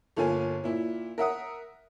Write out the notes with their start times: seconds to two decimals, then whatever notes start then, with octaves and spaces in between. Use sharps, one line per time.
0.17 G1 A#3 F4 A4 G#5
0.64 A#2 E4
1.18 A#4 E5 F#5 D#6